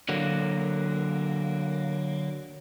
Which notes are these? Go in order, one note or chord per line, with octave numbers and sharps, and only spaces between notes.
D3 F#3 A#3